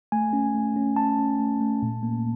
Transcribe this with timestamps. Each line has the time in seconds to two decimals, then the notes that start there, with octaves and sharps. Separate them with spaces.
0.12 A3 G#5
0.33 C#4
0.55 A3
0.76 C#4
0.96 C#4 A5
1.19 C#4
1.39 A3
1.60 A3
1.82 A#2
2.03 A#3